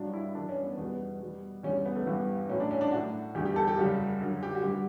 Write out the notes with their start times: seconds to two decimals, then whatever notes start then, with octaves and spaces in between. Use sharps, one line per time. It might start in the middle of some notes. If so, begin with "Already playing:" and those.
Already playing: G2 F#3 D4
0.13 E4
0.35 F#2 E3 G3 D4
0.49 C#4
0.63 B3
0.78 E2 B2 G3 B3
1.21 B2 G3
1.63 E2 D3 G3 C#4
1.74 C#4
1.86 B3
1.96 A3
2.06 G2 E3 G3 B3
2.49 A2 F#3 C#4
2.60 D4
2.71 C#4
2.81 D4
2.92 A2 F#3 F#4
3.35 E2 D3 G3 G4
3.46 G4
3.56 A4
3.67 G4
3.78 F#2 C#3 G3 F#4
4.21 F#2 D3 F#3
4.43 G4
4.55 F#4
4.63 G2 D3 G3 G4